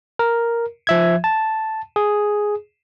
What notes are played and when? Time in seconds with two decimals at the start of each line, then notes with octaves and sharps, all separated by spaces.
0.19 A#4
0.87 F3 E5 G#6
1.24 A5
1.96 G#4